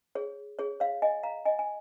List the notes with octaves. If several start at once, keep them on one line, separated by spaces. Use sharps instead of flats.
G#4 C#5
G#4 C#5
C#5 F5
D#5 G#5
F5 A#5
D#5 G#5
G#5